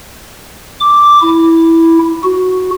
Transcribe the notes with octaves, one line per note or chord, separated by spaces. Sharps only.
D6
E4
F#4